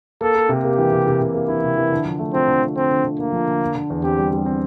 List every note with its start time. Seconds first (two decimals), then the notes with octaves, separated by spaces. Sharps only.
0.21 A#3 A4
0.35 A#3
0.49 C3
0.64 A#3 G4
0.79 E3
0.92 C3
1.07 C3
1.21 C3
1.34 A#3
1.48 E3 E4
1.64 C3
1.77 E3
1.92 D3
2.05 F3
2.19 A3
2.34 F3 C4
2.48 D3
2.63 D3
2.76 D3 C4
2.90 D3
3.04 D3
3.19 D3 A#3
3.32 F3
3.47 D3
3.61 D3
3.75 D3
3.90 E2
4.03 C4 G4
4.19 G3
4.33 G3
4.46 C4